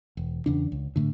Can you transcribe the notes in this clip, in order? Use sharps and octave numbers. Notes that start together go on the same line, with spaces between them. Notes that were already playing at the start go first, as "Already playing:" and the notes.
E1
E2 C#3 D4
C#2
A2 D3